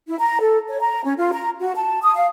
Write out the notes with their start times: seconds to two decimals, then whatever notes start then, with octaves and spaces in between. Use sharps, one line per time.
0.08 E4
0.19 A#5
0.40 A4
0.69 C#5
0.80 A#5
1.04 C#4
1.18 F4
1.33 A#5
1.60 F#4
1.76 A5
2.03 D#6
2.16 F5